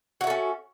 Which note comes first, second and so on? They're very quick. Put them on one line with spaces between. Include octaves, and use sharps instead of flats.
F#4 E5 A4 C#4